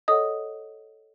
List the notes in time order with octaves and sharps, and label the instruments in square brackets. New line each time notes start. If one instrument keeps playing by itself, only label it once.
[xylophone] A4 C#5 D#5 F#5 D#6